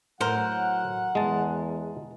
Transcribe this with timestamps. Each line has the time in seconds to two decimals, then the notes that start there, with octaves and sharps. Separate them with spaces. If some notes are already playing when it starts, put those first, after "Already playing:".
0.21 A2 F#3 A#4 C5 F#5
1.15 E2 G#3 A5